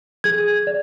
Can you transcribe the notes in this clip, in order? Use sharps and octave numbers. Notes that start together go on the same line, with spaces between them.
G#4 G#6
D5